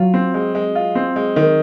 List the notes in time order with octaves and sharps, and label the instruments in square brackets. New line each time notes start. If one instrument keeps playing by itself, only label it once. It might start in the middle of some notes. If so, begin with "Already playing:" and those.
Already playing: [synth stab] F#3 [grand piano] F4
[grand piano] C4
G#3
G#3
F4
C4
G#3
D#3